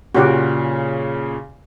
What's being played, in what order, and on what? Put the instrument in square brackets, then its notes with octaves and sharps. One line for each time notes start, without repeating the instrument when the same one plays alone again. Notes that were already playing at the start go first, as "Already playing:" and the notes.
[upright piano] A#2 C#3 [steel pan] F#4 G4